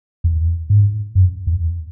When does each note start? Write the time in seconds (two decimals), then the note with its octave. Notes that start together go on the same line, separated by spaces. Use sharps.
0.24 E2
0.70 G#2
1.15 F#2
1.47 E2